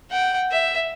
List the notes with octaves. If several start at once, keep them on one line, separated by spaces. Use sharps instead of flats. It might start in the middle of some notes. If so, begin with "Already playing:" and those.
F#5 G5
E5